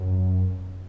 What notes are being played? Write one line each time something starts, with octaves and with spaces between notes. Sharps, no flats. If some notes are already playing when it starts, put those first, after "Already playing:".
Already playing: F#2